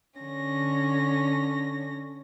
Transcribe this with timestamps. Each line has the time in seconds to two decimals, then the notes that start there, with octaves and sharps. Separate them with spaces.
0.19 D3 C#4 A#6